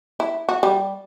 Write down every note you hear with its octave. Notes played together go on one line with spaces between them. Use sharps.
E4
F#4
G3